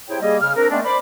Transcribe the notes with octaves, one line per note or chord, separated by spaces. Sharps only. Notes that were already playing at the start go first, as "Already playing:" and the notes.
C3 E4 G#4 C5 C#5 G5
G3 A#3 G#4 D#5
C#3 F6
C4 D4 A#4
G#3 A3 B3 C4 D4
C5 D5 B5